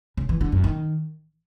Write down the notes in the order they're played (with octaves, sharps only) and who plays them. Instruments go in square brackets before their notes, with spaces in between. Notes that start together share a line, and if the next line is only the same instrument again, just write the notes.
[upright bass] C#3
E3
D3
F#2
D#3